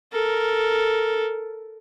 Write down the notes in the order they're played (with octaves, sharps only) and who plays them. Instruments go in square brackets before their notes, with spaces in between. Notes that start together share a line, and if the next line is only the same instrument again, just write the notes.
[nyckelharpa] A4 A#4